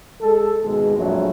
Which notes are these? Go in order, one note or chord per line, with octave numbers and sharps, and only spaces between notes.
G#3 G#4 A4
G#1 B2 G#3
A#1 F2 F#3 A3